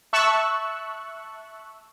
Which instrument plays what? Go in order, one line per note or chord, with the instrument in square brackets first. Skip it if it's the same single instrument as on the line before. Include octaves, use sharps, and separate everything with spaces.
[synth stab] E5 A5 C#6 E6 F#6